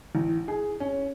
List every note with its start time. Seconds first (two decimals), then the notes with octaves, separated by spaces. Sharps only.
0.15 A1
0.48 G#4
0.80 C#4